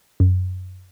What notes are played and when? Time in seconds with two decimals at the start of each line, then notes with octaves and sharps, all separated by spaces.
0.20 F#2